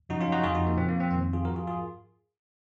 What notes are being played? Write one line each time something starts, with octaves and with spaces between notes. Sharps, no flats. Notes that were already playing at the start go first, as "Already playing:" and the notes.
F#2 C#3 F3 D#4 F#4
C#4 F4
D#4 F#4
F2 C#3 F3 F4 G#4
D#4 F#4
A#3
A#2 F3 C4
A#3
C4
F2 D#3 C4
F4 G#4
G#2 F3 F#4 A#4
F4 G#4
F4 G#4